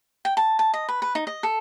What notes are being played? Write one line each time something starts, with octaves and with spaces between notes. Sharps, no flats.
G5
A5
A5
D#5
B4
B4
D#4
D#5
A4